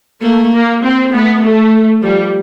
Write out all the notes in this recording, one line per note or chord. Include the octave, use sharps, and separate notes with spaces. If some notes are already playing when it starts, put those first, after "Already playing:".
A3 A#3
A#3
C4
A3 B3
A3
F3 G3